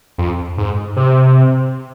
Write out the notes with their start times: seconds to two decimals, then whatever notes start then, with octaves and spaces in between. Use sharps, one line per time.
0.18 F2
0.58 G#2
0.96 C3